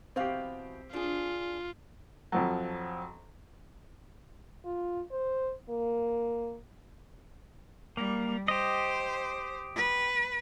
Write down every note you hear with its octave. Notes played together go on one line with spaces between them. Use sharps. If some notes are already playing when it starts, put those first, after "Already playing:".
B2 E3 C4 G4 F5
D4 F4 G#4
F2 F3 F#3
F4
C5
A#3
G3 A#3
G4 C5 D#5
B4